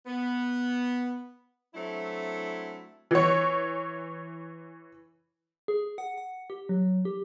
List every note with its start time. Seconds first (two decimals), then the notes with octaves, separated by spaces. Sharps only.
0.06 B3
1.75 F#3 A3 C4 D4 E4
3.11 E3 C#5
5.68 G#4
5.98 F#5
6.18 F#5
6.50 G4
6.69 F#3
7.05 G4